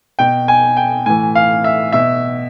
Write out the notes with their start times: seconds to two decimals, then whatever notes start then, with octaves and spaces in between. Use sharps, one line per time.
0.19 B2 G5
0.48 G#5
0.77 G5
1.06 A2 E3 G#5
1.35 F5
1.64 E5
1.93 B2 E5